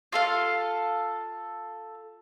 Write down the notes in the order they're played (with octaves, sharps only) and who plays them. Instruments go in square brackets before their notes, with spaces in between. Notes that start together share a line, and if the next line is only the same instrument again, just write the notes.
[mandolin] F4 A4 F5